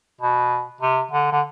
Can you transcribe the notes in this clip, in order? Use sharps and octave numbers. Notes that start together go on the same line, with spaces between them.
B2
C3
D3
D3